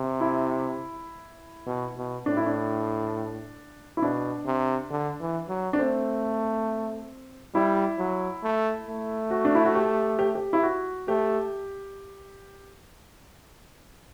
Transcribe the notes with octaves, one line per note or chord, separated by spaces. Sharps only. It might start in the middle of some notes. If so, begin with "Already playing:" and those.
Already playing: C3
E4
B2
B2
A2 D4
E4
D4
E4
B2 D4
C3
D3
E3
F#3
D4
A3 C4
G3 E4
F#3
A3
A3
F#4
D4
E4
F#4
G4
G4
G4
E4
F#4
A3 G4